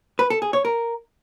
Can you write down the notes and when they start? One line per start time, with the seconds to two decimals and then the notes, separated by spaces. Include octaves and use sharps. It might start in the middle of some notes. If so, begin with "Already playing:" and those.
0.19 B4
0.30 A4
0.42 G#4
0.53 C#5
0.65 A#4